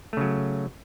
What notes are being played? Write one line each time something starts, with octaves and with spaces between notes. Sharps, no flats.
C#3 F#3 A3